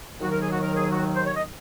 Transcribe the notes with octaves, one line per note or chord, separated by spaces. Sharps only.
D#2 D#3 F#3 F#4
A#4
G#4
F#4
A#4
G#4
F#4
C5
C#5
D#5